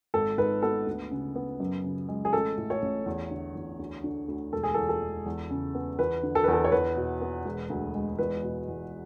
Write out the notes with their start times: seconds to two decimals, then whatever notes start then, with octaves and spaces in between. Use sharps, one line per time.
0.14 G#1 A4
0.38 G#2 B4
0.62 B3 A4
0.86 D2
1.11 C#3
1.36 B3
1.60 F#2
1.84 C#3
2.09 G#3
2.25 G#4
2.33 A1 A4
2.58 A2
2.70 C#5
2.82 A1
3.06 E2
3.31 D3
3.55 E2
3.79 D2
4.04 D3
4.28 D2
4.53 E1 A4
4.63 G#4
4.74 E2 A4
4.89 A4
5.02 G#3
5.26 E2
5.50 C#3
5.75 B3
5.99 E2 B4
6.23 D3
6.35 A4
6.44 B4
6.48 E2
6.53 A4
6.64 C#5
6.72 E2 B4
6.96 B2
7.21 B3
7.45 E1
7.70 D2
7.94 G#3
8.18 E2 B4
8.43 B2
8.68 E2